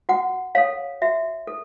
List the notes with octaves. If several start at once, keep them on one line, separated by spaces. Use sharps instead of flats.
F#4 F#5
A4 C#5 F5
F#4 E5
A4